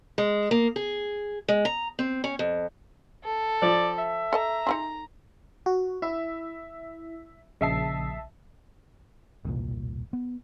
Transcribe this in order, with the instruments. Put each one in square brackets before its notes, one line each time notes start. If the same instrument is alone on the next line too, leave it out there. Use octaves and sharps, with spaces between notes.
[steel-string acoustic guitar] G#3
A#3
G#4
G#3
A#5
C4
C#4
F2
[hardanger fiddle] A4
[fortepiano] F3 [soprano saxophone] D5
[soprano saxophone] E5
[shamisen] A4 D#5 A5 [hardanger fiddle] A#5
[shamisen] D#4 E4 G#4 [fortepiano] C6
[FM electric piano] F#4
[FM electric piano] E4 [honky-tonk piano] E5
[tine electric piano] A#1 C7 [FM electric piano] C#3 [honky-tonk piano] D#5 E5 A5
[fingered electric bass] E1 C2 A#2
B3